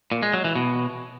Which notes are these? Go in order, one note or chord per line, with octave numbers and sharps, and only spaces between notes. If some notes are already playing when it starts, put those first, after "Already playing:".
A#2
G#3
F#3
E3
B2